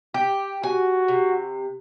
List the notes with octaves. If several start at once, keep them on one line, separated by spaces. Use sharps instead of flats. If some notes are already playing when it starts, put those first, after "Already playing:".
G4
F#4 G#5
C3